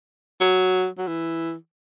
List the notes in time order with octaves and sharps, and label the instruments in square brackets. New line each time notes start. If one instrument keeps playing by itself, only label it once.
[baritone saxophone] F#3
F#3
E3